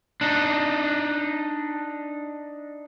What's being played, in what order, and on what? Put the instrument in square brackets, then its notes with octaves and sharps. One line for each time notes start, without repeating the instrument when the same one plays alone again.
[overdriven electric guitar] D4 D#4